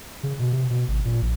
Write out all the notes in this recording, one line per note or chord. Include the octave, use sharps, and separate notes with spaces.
C#3
B2
C3
B2
G#1
A#2
A#1